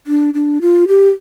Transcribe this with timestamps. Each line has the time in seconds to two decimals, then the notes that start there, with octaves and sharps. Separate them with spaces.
0.07 D4
0.34 D4
0.61 F4
0.88 G4